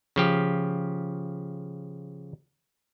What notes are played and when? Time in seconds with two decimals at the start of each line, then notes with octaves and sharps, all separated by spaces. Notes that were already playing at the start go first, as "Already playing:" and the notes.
0.16 C#3 F3 G4